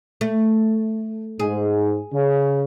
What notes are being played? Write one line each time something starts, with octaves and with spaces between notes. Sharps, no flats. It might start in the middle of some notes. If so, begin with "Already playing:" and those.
A3
G#2 G#4
C#3